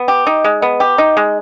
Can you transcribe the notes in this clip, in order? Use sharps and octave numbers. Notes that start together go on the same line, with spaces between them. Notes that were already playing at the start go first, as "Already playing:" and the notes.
Already playing: B3
G4
D#4
G#3
B3
G4
D#4
G#3